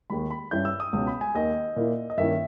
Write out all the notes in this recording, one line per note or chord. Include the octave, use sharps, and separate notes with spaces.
D#2 D#3 G#3 B5
B5
G2 G3 C#4 E4 G6
E6
D#6
C#2 B2 G#3 C#4 D#6
B5
G#5
D#2 D#3 A#3 D#5
A#2 A#3 E4
D#5
G2 D#3 A#3 C#4 E4 E5